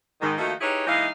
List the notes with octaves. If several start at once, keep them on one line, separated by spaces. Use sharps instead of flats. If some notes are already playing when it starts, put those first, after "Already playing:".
G#2 D#3
D#3 F3 A3 A#3 D#4 F#4
D#4 E4 G4 G#4 B4 C#5
E3 G#3 A#3 D#4 D#5 F5